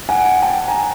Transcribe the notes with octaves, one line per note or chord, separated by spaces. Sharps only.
F#5 G#5
F#5 G#5
G5 A5
G#5 A#5